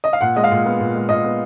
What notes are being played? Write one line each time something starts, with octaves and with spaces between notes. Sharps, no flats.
D#5
F5
A#2 F#5
G#3 D#5
F5
A#2
B3
A#2
G#3
A#2 D#5
B3